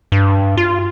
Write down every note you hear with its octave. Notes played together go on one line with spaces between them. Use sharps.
G2
F4